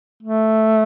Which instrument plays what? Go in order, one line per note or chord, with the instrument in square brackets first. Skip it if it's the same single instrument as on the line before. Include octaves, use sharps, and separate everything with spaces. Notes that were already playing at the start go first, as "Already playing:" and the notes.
[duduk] A3